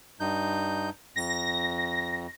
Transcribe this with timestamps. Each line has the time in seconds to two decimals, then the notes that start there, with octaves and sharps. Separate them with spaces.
0.20 G2 D#4 G6
1.16 F2 A#6